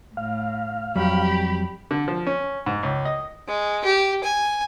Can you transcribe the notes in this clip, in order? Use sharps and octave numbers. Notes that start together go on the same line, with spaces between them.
A2 F5
F2 F#3 G3 G4 B5
D3
F3
C#4
G#2
C#2
D#5
G#3
G4
G#5